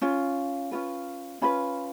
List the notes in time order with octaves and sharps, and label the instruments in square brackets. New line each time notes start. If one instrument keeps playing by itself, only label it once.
[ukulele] C#4 F4
C#4 F4 B4
C#4 F4 B4 B5